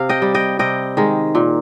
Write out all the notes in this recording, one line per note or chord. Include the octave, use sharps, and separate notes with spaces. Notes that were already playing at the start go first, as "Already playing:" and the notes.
Already playing: C3 F5
D#5 G5
G3
D#5 G5
C3 D#5 G5
D#3 G#3
A#2